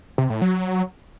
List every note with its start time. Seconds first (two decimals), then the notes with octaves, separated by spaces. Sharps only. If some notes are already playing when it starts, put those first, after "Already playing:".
0.18 C3
0.30 A2
0.42 F#3